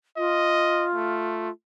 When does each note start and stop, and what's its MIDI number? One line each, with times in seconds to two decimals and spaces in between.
0.17 1.51 65
0.17 0.86 75
0.95 1.49 57